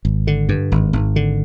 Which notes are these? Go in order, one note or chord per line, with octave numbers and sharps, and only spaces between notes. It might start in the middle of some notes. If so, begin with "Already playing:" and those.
G#1
D3
G2
G#1
G#1
D3